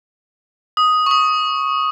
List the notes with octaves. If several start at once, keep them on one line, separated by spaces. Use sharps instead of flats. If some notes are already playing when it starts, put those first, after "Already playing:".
D#6
C#6
D#6